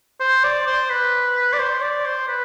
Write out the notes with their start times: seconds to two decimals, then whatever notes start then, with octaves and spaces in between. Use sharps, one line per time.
0.20 C5
0.44 D5
0.67 C5
0.90 B4
1.53 D5
1.59 C5
1.82 D5
2.05 C5
2.28 B4